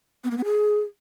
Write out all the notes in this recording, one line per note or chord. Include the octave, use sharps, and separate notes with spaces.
B3
A#3
B3
G#4